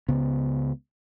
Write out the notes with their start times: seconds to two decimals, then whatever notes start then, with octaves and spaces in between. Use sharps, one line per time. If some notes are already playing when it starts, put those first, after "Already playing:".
0.08 C#2 C#3 B3